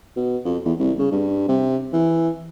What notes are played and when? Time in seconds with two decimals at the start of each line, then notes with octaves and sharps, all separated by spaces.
0.16 B2
0.45 F2
0.65 E2
0.79 C2
0.99 C#3
1.12 G2
1.48 C3
1.93 E3